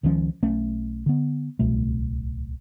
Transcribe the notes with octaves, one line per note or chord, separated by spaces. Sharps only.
C#2 D#3 F3 C#4
B1 A3 C#4
D3 B3
D1 C2 B2 A3